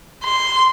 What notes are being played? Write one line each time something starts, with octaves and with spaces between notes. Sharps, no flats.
C6